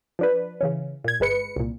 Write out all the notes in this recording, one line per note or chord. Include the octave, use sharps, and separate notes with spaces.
F3 D4 B4
C#3 E3 C#4
A#2 G#6
G1 G#3 B4 C#7
C2 A#2